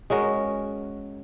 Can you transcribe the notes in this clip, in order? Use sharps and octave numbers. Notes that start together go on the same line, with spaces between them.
G#3 C#4 F#4 A#4